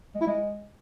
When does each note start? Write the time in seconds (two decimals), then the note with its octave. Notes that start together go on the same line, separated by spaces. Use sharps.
0.15 G#3
0.21 E4
0.27 G#3